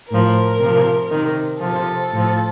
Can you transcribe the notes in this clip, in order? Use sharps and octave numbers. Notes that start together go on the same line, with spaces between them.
A2 F3 A#4
C3 F3
C3 D#3
C3 F3 A4
A2 F3